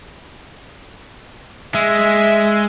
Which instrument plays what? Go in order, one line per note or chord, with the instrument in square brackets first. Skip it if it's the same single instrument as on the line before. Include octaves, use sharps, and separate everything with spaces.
[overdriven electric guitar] G#3 [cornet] E5